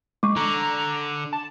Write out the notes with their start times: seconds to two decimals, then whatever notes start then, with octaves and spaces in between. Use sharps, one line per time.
0.23 G#3 C#6 D6
0.37 D3 A#5
1.33 A5